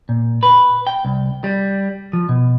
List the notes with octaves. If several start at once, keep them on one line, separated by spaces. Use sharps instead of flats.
A#2
B4
G5
C2
G3
F3
B2